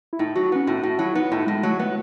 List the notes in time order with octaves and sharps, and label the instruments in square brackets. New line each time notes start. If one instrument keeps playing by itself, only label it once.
[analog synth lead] E4
[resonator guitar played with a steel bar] A2 [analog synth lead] D#4
[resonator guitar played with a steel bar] F#3 [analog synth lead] F#4
[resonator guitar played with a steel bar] B3 [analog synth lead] C#4
[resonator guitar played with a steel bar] A2 [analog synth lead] D#4
[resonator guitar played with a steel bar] A2 [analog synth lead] F#4
[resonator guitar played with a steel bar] F#3 [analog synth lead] E4
[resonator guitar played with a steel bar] B3 [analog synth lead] D#4
[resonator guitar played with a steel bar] A2 [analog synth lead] D#4
[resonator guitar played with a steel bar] A2 [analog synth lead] G#3
[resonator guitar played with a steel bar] F#3 [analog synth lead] A3
[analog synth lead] A3 [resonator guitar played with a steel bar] B3